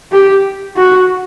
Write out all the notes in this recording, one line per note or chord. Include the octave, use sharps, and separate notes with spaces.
G4
F#4